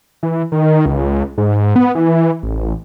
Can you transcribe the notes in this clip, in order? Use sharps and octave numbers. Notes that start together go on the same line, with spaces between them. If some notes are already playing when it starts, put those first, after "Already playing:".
E3
D#3
C#2
G#2
B3
E3
A1